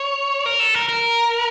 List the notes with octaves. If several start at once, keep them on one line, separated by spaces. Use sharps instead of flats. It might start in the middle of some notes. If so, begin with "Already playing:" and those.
Already playing: C#5
A#4
A4
A#4
A#4